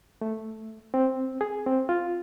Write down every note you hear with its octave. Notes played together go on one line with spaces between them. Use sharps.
A3
C4
G#4
C4
F4